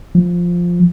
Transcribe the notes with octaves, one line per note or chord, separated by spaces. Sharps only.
F3